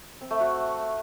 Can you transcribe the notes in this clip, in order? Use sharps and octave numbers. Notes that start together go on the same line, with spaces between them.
C4
A3
F#4